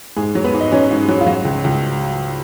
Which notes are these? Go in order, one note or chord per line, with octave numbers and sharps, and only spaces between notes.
G#2 G#3 G#4
F#3
B3 B4
G#2
D#5
F#3 C#4 C#5
G#2
F#3
F4
F#3 F#4
C#2
C#2